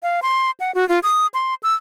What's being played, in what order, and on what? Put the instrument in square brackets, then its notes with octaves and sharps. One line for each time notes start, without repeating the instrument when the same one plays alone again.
[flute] F5
C6
F#5
F#4
F4
D#6
C6
E6